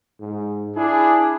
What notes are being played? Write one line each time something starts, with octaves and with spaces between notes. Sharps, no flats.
G#2
D4 E4 G#4